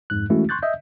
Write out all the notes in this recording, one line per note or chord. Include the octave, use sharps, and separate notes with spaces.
F2 G#2 F#6
E3 G#3 A3 C#4 E4 F#4
C6 C#6 F#6 G6 A6
D#5 E5 G6